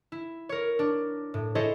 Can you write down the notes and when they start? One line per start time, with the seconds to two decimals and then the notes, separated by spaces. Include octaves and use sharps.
0.12 E4
0.49 A#4 C#5
0.79 D4
1.34 A2
1.55 E4 G#4 A4 C5 C#5 D#5